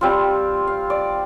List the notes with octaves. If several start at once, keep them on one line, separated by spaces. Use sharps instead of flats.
G3 C4 F4
F5
D5